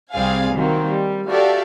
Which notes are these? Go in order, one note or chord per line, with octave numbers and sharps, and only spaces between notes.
C2 C4 G#4 D5 F5 G#5
D#3 F#3 A#3 C4
G3
F#4 G4 A4 D5 E5 F5